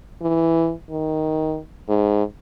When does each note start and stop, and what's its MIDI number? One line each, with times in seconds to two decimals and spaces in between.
0.22 0.73 52
0.91 1.58 51
1.88 2.23 44